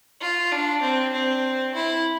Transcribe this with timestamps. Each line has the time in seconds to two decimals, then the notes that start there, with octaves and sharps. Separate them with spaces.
0.21 F4
0.52 D4
0.81 C4
1.13 C4
1.74 E4